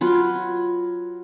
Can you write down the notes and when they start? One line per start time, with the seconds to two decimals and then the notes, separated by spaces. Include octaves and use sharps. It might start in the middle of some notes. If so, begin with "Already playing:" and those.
0.01 F#3 F4 B4